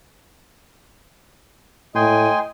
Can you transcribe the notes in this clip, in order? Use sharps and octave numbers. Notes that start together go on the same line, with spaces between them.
A2 D#5 G5 G#5 C6